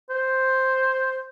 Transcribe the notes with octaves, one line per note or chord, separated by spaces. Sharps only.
C5